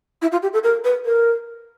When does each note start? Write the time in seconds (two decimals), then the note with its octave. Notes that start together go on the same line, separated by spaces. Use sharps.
0.21 E4
0.31 F4
0.42 G4
0.53 A4
0.63 A#4
0.84 B4
1.05 A#4